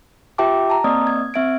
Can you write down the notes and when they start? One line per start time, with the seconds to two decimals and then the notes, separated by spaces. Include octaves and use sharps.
0.38 F4 G4 E5 G5 A5 D6
0.70 A5 A#5
0.84 A#3 C4 D5 D#5 D#6
1.07 G#6
1.34 C4 E5 G#6 D7